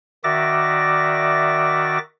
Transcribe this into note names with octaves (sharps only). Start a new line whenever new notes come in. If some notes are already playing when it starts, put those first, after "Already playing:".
D#3 F#4 D5 E5 D6 A#6